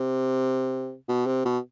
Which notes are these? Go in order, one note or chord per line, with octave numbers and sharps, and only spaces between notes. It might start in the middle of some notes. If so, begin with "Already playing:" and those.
Already playing: C3
B2
C3
B2